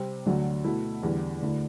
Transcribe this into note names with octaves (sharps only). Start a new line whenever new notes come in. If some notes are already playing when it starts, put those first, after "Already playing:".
Already playing: C3 G3 C4
D2 D3 F#3
B2 A3 E4
E2 D3 G3
D2 D3 A3 E4